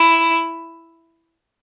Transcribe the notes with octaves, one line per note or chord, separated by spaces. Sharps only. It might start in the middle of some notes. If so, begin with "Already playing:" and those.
Already playing: E4